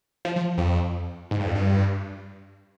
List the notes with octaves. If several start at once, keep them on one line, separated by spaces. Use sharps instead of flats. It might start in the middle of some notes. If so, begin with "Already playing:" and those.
F3
F3
F2
G#2
G2
F2
G2